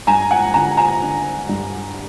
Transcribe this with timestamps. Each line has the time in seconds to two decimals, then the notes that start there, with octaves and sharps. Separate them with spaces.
0.07 G2 G#5 A#5
0.31 F#5 G#5
0.54 D3 G#5 A#5
0.77 G#5 A#5
1.02 D3
1.49 G2